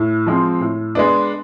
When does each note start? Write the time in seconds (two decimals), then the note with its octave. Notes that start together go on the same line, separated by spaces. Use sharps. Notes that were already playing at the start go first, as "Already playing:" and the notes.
Already playing: A2
0.26 F3 G#3 C4
0.61 A2
0.95 G#3 B3 D4